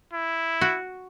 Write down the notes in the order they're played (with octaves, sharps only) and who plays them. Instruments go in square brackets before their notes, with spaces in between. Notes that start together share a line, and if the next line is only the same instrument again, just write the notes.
[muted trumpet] E4
[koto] F#4